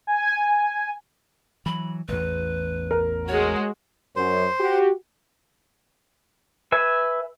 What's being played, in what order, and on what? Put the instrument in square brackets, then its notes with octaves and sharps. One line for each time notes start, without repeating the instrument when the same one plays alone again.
[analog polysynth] G#5
[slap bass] E3 F#3 [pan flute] B5
[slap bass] A1 E2 [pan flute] B4
[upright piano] A#4
[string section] G#3 F#4 [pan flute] C#5
[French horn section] F#2 [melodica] C5 C6
[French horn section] F#4 G4
[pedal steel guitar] B4 E5 G#5